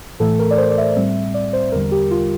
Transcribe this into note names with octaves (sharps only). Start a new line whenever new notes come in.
A2 E3 A3 A4
A#4
D5
C5
D5
E5
A2 G3 C4
D5
C5
E2 D3 G3 A#4
G4
F4